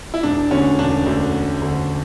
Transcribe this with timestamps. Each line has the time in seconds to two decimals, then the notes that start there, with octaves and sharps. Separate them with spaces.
0.14 E4
0.23 E1 D4
0.51 D2 D3 C#4
0.79 E1 D4
1.06 D2 D3
1.34 E1
1.61 D2 D3